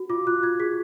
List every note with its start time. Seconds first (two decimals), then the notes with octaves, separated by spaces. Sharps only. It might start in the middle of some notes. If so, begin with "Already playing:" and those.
Already playing: F#4
0.10 F4 D6
0.27 F4 F#6
0.43 F4 G#6
0.60 G#4 B6